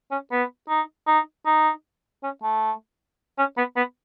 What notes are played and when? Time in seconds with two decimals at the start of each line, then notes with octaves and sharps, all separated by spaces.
0.11 C#4
0.31 B3
0.69 D#4
1.07 D#4
1.46 D#4
2.23 C#4
2.43 A3
3.38 C#4
3.57 B3
3.76 B3